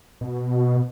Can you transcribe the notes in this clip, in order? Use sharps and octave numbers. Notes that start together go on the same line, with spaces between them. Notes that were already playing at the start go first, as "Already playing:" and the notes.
B2